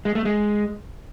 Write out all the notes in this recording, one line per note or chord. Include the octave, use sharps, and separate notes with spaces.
G#3
A3
G#3